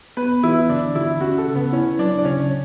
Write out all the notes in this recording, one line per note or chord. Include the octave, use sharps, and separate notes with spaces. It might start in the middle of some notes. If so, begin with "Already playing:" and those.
B3 B4
E3 E4
D3 D4
D3 E4
C#4 F#4
A4
C#3
B3
C#4 E4
F#3 D4
D4
C#3 C#4